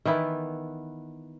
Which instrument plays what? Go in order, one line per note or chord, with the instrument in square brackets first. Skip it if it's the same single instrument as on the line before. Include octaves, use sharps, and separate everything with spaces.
[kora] D#3 E3 B3 E4